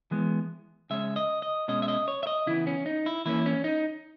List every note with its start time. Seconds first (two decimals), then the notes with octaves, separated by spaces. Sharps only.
0.11 E3 G#3 B3
0.90 C#3 G#3 C#4 E5
1.16 D#5
1.42 D#5
1.68 B2 G#3 C#4 D#5
1.82 E5
1.88 D#5
2.08 C#5
2.23 E5
2.27 D#5
2.46 C#3 E3 B3 E4
2.67 C#4
2.86 D#4
3.06 E4
3.26 E3 A#3 C#4 E4
3.46 C#4
3.64 D#4